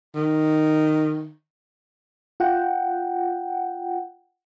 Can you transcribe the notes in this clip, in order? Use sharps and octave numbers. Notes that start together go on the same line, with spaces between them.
D#3
F4 F#5 G5